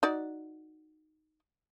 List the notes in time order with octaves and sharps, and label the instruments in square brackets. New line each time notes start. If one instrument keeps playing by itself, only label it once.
[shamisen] D#4 F#4 D5